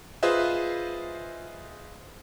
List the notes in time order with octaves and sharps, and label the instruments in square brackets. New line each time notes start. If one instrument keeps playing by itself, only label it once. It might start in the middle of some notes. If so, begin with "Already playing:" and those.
[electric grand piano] F4 G#4 B4 C5 D#5 E5